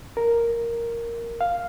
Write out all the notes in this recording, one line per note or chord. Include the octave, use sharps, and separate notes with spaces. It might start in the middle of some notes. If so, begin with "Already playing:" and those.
A#4
F5